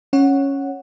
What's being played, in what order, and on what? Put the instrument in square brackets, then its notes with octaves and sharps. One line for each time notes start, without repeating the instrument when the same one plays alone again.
[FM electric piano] C#4 C#5 F#5